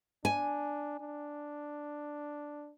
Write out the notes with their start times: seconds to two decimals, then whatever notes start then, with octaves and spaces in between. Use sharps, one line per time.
0.25 D4 G#5
1.00 D4